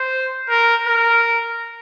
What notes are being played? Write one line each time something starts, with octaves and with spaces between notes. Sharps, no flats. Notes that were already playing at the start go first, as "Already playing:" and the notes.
Already playing: C5
A#4
A#4